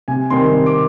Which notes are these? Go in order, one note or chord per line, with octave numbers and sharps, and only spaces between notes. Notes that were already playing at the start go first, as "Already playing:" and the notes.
C3 G#5
D#3 G3 C4 D#4 C6
C3
D6